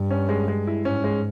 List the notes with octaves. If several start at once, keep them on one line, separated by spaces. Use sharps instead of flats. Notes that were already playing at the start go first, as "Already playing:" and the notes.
Already playing: G2
C#4
G#3
G#3
E4
G#2 C#4
G#3